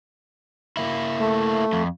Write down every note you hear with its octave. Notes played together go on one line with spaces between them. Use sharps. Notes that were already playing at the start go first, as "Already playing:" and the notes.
A#3 E4
A3
F2